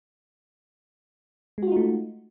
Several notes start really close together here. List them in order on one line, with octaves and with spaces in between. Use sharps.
G#3 F#4 F4 D#4 A3